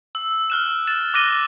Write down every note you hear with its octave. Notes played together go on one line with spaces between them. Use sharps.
E6
F6 F#6 E7
A6 E7
D6 F#6 A#6 D#7 G7